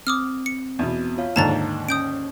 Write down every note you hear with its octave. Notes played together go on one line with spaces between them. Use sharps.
C4 D6 D#6 F6
C#7
E2 B2
F4 C#5 F5
D#2 G#2 D3 D#4 A5 A#5 A6
C#4 D#6 G6 D7